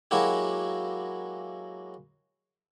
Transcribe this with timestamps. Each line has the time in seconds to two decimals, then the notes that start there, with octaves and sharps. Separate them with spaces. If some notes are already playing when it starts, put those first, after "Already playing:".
0.11 F#3 G#3 A#3 E4 F#4 G4